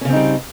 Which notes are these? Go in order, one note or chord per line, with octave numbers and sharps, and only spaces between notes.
C#3 G3 C4 C#4 D#4